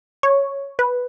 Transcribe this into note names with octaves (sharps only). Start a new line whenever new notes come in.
C#5
B4